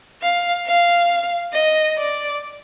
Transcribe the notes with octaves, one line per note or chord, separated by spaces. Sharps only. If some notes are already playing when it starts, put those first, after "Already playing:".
F5
F5
D#5
D5